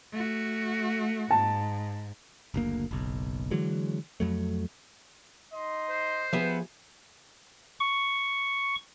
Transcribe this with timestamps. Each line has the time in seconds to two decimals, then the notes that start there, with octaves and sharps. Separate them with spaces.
0.12 A3 F#4
1.31 G#2 A5
2.54 F#1 D2 A#3
2.91 F#1 B1
3.51 D3 E3 F#3 G#3
4.20 F2 F#3 A3
5.53 D#4 D#5 C6
5.90 C5
6.33 F3 B3 G4 G#4 E5
7.80 C#6